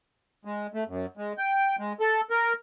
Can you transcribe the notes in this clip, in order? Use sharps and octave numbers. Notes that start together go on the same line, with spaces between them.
G#3
A3
F#2
G#3
G5
G#3
A4
A#4